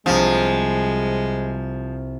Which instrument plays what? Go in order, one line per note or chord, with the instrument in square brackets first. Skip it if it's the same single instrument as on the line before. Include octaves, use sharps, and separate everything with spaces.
[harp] C2 C4 [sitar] F3 [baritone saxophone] G#3